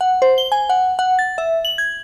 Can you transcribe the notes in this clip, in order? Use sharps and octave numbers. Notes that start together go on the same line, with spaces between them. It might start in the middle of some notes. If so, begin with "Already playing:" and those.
F#5
C5
G7
G#5
F#5
F#5
A6
E5
F#7
G#6